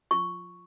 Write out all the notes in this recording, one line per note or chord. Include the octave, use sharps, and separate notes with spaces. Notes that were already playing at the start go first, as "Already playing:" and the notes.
F4 C#6